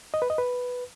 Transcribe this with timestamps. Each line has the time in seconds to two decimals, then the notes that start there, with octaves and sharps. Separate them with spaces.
0.14 D#5
0.22 B4
0.30 D#5
0.38 B4